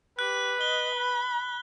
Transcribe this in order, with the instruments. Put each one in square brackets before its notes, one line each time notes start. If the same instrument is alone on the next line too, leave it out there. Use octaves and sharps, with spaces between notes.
[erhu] G4 [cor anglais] B4 [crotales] F#6
[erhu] D#5 [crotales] G7
[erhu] B5